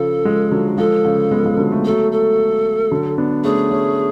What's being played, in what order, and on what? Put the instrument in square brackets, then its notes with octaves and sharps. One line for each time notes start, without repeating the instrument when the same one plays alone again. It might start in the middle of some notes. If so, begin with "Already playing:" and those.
Already playing: [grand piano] C#3 F3 [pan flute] A4
[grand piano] F3 G#3
D3 F#3
[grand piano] F3 G#3 [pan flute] A4
[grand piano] C#3 F3
G#3 B3
F3 G#3
D3 F#3
A3
B3
[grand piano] F#3 A3 [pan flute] A4
[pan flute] A4
[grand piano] D3 F#3
B3 D4
[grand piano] A3 C#4 [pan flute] G#4
[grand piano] A3 C#4